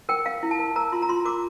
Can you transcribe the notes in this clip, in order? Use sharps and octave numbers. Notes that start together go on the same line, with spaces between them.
A#4 G5
A#4 F5
E4
A5
A#4
A#4 A#5
F4 C6
A#5
F4 C6
A#4 D6